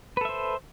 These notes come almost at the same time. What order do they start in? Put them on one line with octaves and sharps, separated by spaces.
B4 A4 E5 C5